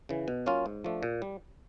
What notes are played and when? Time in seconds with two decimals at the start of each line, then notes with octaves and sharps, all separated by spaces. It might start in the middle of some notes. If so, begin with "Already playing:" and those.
0.09 C#3 E3
0.28 B2
0.46 F#3 A#3 C#4 F4
0.66 G#2
0.84 F3 A3 D4
1.03 A#2
1.22 G3